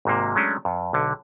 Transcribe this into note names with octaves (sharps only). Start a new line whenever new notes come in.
G#1 G#2 C3 A#3
F#3 G#3 A3 C#4 D4
F2
B1 D3